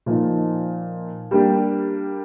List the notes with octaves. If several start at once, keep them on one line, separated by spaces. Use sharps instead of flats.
A#2 F3 A#3 D#4
G3 A#3 D4 G4